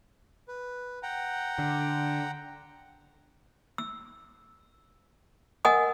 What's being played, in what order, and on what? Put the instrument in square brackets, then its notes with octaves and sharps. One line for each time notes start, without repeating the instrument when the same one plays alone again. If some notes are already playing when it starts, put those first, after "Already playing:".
[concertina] B4
F#5 G5 A#5
[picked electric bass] D3
[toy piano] E6
A#4 D#5 F#5 G#5 D#6